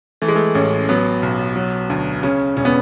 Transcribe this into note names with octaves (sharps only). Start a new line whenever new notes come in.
E3 A3
G#3
A3
A1 C#4
F#3 B3
B1
F#3
D2
C#3 C#4
E1 C#4
B3